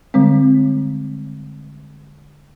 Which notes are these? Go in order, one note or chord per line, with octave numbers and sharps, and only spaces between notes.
D3 G3 G#3 C4